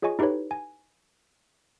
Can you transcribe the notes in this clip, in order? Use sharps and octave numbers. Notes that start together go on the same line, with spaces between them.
F4 G#4 C#5 D#5 G#5 C#6
D#4 E4 G4 A4 B4 C#5
G#5